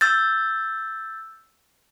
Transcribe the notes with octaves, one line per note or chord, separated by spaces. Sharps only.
E6 G6 A6